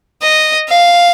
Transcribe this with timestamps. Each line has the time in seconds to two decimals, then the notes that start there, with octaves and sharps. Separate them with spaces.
0.22 D#5
0.69 F5